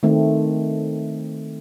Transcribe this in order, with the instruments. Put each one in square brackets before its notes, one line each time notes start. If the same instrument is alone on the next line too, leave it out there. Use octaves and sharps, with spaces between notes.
[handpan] D#3 A3 C4